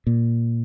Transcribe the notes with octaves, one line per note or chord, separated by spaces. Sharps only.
A#2